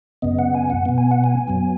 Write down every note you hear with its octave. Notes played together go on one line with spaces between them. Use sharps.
F#2 C#3 B3 D#5
F#5
G#5
F#5
B2 B3
G#5
F#5
G#5
F#2 F#3 B3